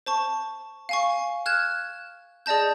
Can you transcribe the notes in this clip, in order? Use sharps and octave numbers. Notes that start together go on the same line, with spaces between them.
C5 A5 C#6
F5 G#5 C#6
F6 F#6 G#6 E7
G#4 D5 D#5 A5 G6